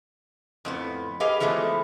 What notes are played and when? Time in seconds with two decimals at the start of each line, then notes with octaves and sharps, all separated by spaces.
0.65 F2 A2 B3
1.20 G4 G#4 B4 D#5 F5
1.40 E3 F3 G#3 A3 B3